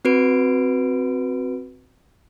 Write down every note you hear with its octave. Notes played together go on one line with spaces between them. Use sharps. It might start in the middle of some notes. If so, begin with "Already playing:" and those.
C4 F#4 B4 D7